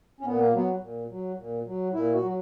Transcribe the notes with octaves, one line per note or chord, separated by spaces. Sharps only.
C#4
A#2 B3
A#3
F#3 B3
A#2
F#3
A#2
F#3
A#2 E4
F#4
F#3